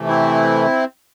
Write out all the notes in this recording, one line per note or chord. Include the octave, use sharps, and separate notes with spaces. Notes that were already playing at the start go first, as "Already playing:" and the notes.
Already playing: C3 E3 A3
C4 E4